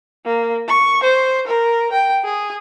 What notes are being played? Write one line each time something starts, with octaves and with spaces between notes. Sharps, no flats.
A#3
C#6
C5
A#4
G5
G#4